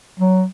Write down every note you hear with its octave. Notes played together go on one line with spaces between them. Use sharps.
F#3